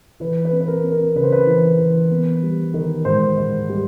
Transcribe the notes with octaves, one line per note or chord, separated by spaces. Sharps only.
E3 B4
B4
C4
B4
A#4
C4
A#4
C#3 B4
C5
B4
E3
E3
B3
G3
D#3
G#2 C5
G#2
G3